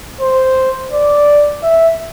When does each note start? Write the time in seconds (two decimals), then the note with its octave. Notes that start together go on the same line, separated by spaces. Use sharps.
0.21 C5
0.92 D5
1.63 E5